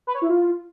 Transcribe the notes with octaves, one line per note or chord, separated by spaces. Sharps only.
B4
C#5
E4
F4